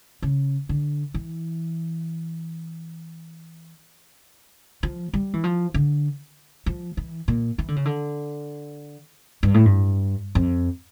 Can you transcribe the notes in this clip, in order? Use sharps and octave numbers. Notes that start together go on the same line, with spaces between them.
C#3
D3
E3
F3
G3
E3
F3
D3
F3
E3
A#2
E3
D3
C#3
D3
G2
A2
G2
F2